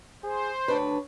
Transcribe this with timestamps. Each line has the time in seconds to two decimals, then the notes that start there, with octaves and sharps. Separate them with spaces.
0.24 G#4 C5
0.68 D2 D4 B4 C#5